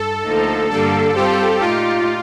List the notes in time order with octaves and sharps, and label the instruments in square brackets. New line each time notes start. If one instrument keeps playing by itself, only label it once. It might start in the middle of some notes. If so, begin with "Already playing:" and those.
Already playing: [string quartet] G2 [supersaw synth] A4
[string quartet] D2 D3 F3 A#3 D#4
[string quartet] G2 D3 G3 A#3 D4 [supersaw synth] A4
[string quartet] G3 C4 F4 C5 [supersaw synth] G4
[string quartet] A#2 A3 D#4 G4 D5 [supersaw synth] F4